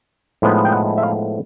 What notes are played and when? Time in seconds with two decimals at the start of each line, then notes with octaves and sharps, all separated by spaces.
0.42 A2 F3 G#3 B3 D#4
0.65 G5
0.73 F#5
0.98 E5
1.03 F5